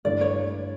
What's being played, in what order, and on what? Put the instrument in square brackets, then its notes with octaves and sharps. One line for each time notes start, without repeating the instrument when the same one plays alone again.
[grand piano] G2 D3 A3 E4 B4 [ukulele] D5
[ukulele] C#5